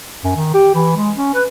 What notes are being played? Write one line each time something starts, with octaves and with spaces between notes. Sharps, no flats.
F#2
D#3
G4
E3
G#3
C#4
B4